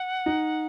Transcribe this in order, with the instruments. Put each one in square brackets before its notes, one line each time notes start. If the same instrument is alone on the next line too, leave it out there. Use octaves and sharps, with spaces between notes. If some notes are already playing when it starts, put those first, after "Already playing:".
Already playing: [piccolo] F#5
[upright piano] D#4